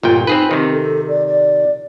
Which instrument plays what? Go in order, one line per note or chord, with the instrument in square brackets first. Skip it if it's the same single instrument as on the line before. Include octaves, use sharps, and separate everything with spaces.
[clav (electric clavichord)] G1 A#2 G5 [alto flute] F4
[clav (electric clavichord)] C4 G#4 B4 [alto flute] D#4
[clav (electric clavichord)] C3 D#3 [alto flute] C4
[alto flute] A4
D5
D5